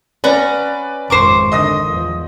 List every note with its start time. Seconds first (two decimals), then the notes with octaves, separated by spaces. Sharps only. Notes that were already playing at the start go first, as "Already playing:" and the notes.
0.24 C#4 B4 D5 F#5 A#5
1.10 G#1 F2 C5 C#6 D6
1.52 D3 D#3 D#5 D#6 A#6
1.85 E2 F3